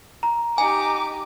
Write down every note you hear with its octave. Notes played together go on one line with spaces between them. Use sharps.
A#5
D#4 G4 G#5 D6